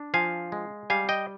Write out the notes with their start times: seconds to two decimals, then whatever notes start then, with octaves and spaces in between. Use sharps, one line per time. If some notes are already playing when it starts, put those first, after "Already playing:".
Already playing: D4
0.14 F3 F5 G#5
0.52 G#3
0.90 G3 F5 G#5
1.09 D#5 G5